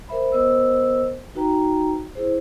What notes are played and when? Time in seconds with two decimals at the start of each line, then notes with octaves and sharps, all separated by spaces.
0.09 A#4 C5 E5 B5
0.32 B3 A#4 C5 D#5 E6
1.35 D#4 F#4 B4 G5 A#5
2.15 E4 G#4 C5